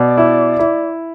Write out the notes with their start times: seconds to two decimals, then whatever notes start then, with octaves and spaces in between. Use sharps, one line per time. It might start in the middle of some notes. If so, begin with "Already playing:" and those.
Already playing: B2 D5
0.17 E4
0.59 E4